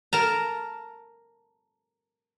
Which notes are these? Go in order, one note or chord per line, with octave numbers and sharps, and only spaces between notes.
A#4 A5 A#5